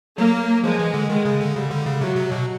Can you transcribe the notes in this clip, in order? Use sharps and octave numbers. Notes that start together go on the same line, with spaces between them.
F#3 A#3
F3 G#3
E3
D3
D#3 G#3
C#3
D3
C#3 G3
D3
C#3
C3 F#3
C3
B2